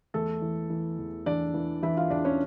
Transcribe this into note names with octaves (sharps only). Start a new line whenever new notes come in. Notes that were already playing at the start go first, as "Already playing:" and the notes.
E2 A3 A4
E3
E3
E2
E2 D4 D5
E3
E3 E4 E5
F4 F5
E2 D4 D5
C#4 C#5